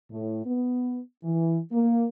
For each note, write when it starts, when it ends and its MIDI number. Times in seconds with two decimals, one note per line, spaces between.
0.11 0.42 45
0.46 0.99 59
1.24 1.59 52
1.72 2.06 58